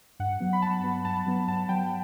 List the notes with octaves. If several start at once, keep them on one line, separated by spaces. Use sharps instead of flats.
G2 F#5
F#3 B3
B5
G2 A5
F#3 B3
G2 A5
F#3 B3
G2 A5
F#3 B3 G5